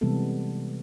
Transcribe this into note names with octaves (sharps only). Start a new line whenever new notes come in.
C3 E3 G3 G#3 B3 A4